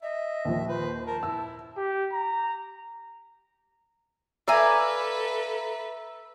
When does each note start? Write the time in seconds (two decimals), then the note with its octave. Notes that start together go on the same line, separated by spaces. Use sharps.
0.03 D#5 E5
0.45 D#2 A#2 F3
0.67 B4 C5
1.06 A#4 A5
1.23 E4 E6
1.77 G4
2.13 A#5
4.48 A4 B4 D5 E5 F5 G#5 A#5